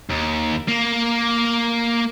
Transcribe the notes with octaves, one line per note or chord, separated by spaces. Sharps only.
D#2
A#3